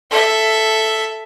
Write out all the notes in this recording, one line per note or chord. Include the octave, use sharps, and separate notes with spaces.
A4 E5